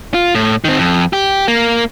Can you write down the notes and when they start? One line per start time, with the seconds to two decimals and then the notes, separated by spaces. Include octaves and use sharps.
0.14 F4
0.35 A2
0.64 D#3 C4
0.79 F2
1.13 G4
1.48 A#3